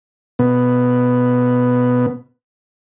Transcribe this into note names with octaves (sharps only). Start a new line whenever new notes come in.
B2 B3